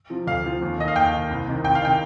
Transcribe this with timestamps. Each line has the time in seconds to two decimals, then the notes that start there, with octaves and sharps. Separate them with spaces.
0.10 C3 F3
0.27 D2 F5
0.44 C3 F3
0.62 D#2
0.78 D#3 D#5
0.88 F5
0.96 D#2 G5
1.13 D#3
1.30 C2
1.47 C3 D#3
1.64 C2 G5
1.75 F5
1.82 C3 D#3 G5